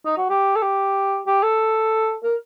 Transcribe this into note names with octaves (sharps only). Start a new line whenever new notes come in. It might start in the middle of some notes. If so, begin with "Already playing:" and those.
D#4
F#4
G4
A4
G4
G4
A4
A#4